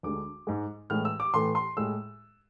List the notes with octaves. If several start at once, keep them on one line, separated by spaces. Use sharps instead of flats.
D2 D3 G#3 D6
G#2 G#3
A2 E3 G#3 F6
E6
D6
A2 E3 A3 C6
C6
A2 G#3 E6